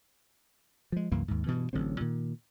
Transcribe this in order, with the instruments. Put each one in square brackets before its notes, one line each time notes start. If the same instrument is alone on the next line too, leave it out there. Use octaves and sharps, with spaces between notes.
[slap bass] F3 G#3
C2 F#2 E3 A#3
D#2 G#2
G2 B2 E3
A1 D3 F#3 C4
A#2 D#3